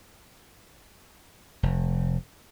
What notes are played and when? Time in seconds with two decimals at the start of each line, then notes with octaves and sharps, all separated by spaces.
1.63 F1